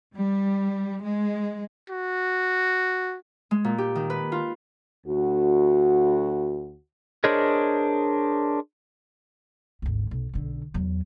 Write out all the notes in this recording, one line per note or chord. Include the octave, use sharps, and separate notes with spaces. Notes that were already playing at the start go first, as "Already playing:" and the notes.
G3
G#3
F#4
G#3
A#2
G4
D#3
B4
F4
D2 F#4
D4 G#4 A#4 C5 C#5 D#5
G#1 D2
B1
B1 D3
E2 F#3